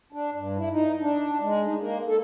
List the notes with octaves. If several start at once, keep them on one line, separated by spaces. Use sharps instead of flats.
D4
G2
E4
D#4
D4
G#3
D#4
A#3
A4